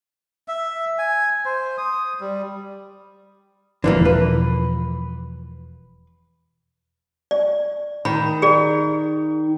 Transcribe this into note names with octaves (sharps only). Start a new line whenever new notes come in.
E5
G#5
C5
D#6
G3
E1 B1 D3 E3 F3 A#3
B4
D5
D#3 B5
G#4 D5